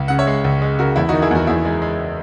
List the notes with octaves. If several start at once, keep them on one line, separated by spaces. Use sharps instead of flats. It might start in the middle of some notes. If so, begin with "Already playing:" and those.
Already playing: C#2
C#3 F#5
C#5 E5
G#3
C#2
G#3
C#3 F#4 A#4
E2 E4
D#3 D#4 F#4
E4 G#4
E2 F#4 A#4
E2 E4 G#4
G#3
G#3